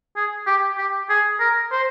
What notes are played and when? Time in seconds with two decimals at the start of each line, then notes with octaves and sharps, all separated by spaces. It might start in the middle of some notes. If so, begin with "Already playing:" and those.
0.16 G#4
0.47 G4
0.78 G4
1.10 G#4
1.40 A#4
1.72 C5